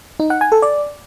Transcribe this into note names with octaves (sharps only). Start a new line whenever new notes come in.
D#4
F#5
G#5
A4
D5